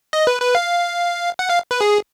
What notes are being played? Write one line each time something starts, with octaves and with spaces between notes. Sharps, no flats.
D#5
B4
B4
F5
F#5
F5
B4
G#4